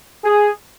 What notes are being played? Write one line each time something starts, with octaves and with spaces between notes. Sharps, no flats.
G#4